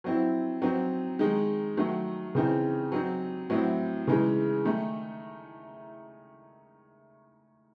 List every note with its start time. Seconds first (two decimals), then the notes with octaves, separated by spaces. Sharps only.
0.04 F#3 C4 E4
0.62 F#3 C4 D#4
1.19 D#3 G#3 D#4
1.77 D#3 F#3 A3
2.35 C#3 E3 C4 D#4
2.92 F#3 C4 D#4
3.50 A2 F#3 C4 E4
4.07 C#3 E3 G#3 D#4
4.65 D#3 A3 D#4